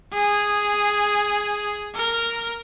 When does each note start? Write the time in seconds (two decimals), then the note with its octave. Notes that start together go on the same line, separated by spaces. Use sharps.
0.13 G#4
1.95 A#4